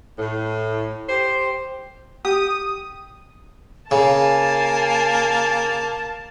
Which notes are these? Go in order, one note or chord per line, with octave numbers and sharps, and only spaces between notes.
A2
G4 C5
G4 D#6
C#3 A#3 G#5 A5